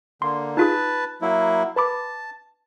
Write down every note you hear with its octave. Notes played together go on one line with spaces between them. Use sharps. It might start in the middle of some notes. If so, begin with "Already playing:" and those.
D3 A#3 C6
D#4 F4 G#4 B4 A5
F#3 A#3 E4
B4 A5 B5 D6